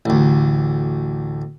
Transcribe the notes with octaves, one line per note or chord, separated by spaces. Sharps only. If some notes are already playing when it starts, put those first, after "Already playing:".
A1 D2